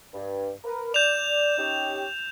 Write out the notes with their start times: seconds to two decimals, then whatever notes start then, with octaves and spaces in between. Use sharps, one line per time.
0.14 G2
0.64 A#4 B4
0.94 D5 G6 E7 F7
1.58 C#4 D#4 G4